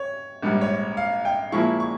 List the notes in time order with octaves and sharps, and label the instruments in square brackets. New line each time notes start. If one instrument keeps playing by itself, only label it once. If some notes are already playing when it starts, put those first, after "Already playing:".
Already playing: [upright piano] C#5
[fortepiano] A#1 G#2 G3
[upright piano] C#5
F5
G5
[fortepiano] A#2 F3 G#3 E4 [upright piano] C#6
[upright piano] C#6